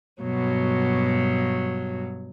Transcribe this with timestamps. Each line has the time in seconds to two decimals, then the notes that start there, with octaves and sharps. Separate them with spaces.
0.22 G2 B2 F#3